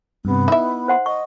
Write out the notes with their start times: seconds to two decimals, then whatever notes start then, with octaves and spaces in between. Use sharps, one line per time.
0.25 G2 C3 B3
0.48 D#4 E4 E5
0.88 C5 F#5 C6
1.06 D#5 C#6